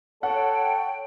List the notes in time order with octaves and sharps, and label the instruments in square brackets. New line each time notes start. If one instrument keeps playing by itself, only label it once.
[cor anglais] A4 [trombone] C#5 [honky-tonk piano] F#5 [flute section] G5